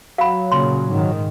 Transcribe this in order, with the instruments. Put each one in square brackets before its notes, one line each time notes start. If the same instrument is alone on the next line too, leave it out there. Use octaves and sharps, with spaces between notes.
[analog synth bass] F#3 [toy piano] F5 B5
[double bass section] A#2 C#3 [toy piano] C6
[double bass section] G#2 D#3